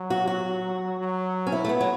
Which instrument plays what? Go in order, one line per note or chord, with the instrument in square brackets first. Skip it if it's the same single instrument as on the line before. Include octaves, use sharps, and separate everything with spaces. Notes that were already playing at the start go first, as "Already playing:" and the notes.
Already playing: [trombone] F#3
[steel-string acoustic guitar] F#4
F#4
[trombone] F#3
[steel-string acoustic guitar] C#4
E4
A3
B3
F#3